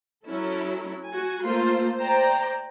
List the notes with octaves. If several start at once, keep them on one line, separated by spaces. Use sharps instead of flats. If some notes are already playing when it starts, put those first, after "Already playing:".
F#3 C#4 E4 A4
F#4 G#5
A3 A#3 F4 A4 C5 C6
C5 D5 G5 A#5